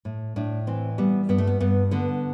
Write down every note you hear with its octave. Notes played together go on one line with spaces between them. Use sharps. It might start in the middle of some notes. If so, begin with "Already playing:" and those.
A2
A2 D4
E3 C4
G3 B3
G2 B3
A3
B3
G2 B3
D3 B3